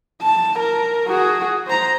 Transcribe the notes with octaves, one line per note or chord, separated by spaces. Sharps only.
A5
A#4
F#4 G#4
C5 A#5